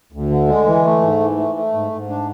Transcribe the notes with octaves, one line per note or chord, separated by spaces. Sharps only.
D2
D3
G#3
E3
A3
G#2
E3
A3
A3
G#2
G#2
D4